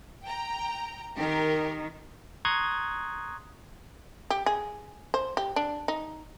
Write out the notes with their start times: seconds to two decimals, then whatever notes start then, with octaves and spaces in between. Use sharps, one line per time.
0.24 G5 A#5
1.18 D#3 G4 A#4
2.45 A#5 C6 C#6 D#6 F#6 G#6
4.30 G4
4.46 G#4
5.14 C5
5.37 G4
5.56 D4
5.88 D#4